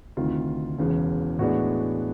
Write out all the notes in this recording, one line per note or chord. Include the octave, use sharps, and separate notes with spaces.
D2 C3 D#3 F4
E1 E2 C#3
A2 E3 G#3 B3 D4 F#4